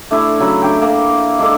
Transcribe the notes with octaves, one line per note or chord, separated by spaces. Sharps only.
A3 D4 E4 A4
C#3 F#3 B5
D4 G5
A#3
G#3 D4 A4 D5